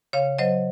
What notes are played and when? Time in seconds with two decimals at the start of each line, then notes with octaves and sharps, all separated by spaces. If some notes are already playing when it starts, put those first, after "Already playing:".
0.13 C#3 C#5 F5
0.39 F#3 C5 D#5